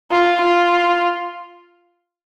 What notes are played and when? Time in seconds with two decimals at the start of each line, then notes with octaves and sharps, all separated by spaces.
0.11 F4
0.41 F4